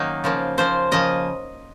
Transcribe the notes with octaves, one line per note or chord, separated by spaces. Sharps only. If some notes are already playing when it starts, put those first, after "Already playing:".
Already playing: D#3 F#3 A#3 C#4 D#4
C#3 F3 A#3
C#3 F3 A#3 C5
C#3 F3 A#3 D#5